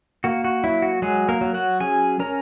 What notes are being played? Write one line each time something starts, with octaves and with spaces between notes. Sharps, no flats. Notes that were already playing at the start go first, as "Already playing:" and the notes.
A#3 F#4
F#4
F#3 E4
F#4
F#3 G#3 G#4
A#3 A#4
F#3
F#4 F#5
C#4 G#4 G#5
C#4 A#4 A#5